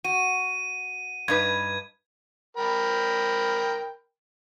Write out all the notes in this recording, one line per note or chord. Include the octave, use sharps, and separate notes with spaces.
F#4 D#7
G2 D#4 B4 G#6
A#4 G5 B5